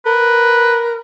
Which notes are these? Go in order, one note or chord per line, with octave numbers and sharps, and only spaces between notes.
A#4 B4